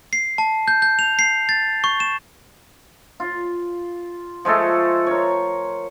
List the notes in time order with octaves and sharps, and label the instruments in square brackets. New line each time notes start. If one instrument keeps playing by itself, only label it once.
[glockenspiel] C7
A5
G6
G6
F7
C7
A6
C#6
E7
[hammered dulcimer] F4
F3 G#3 A3 A4
A#4 C#5